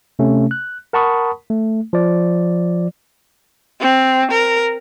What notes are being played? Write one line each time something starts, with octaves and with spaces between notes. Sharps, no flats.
C3 A3 C#4
F#6
A#4 F#5 A5 B5 C#6 D#6
A3
F3 D5
C4
A#4